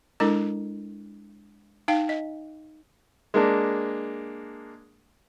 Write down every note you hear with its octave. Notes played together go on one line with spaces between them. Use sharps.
G#3 D4 E4 A4 A#4
D#4 F5 G5
D#5
G#3 A#3 D4